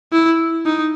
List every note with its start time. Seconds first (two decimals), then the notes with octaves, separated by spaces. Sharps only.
0.12 E4
0.66 D#4